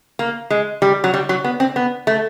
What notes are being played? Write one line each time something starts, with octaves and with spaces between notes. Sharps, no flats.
A#3
G#3
G3
F#3
G3
F#3
B3
C4
B3
A3